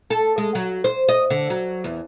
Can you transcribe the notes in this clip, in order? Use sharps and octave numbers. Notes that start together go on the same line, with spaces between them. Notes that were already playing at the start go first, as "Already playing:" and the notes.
A4
G#3
F#3
C5
D#5
D3
F#3
E2